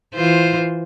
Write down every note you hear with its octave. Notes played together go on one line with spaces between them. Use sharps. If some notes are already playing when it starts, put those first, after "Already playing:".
E3 F4 C5